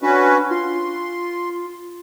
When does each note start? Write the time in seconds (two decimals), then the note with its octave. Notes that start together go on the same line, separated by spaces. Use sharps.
0.02 C#4 D4 F#4 B4
0.51 F4 C6